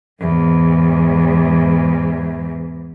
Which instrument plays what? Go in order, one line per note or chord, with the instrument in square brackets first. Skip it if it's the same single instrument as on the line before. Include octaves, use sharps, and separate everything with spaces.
[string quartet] E2 G#2